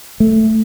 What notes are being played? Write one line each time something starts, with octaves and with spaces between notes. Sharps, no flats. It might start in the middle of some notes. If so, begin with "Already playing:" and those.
A3